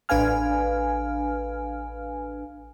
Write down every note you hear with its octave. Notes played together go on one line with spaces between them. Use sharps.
A1 D4 B4 F5 G#5 F6